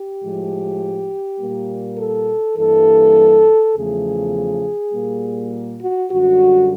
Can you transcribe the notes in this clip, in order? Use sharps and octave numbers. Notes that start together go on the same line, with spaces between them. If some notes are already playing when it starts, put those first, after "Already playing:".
Already playing: G4
A2 F3 G#3
A#2 G3 A#3
A4
G2 E3 G3 A#3 A4
E2 C#3 F3 A3 G#4
A#2 G3 A#3
F#4
F#2 D3 G3 F#4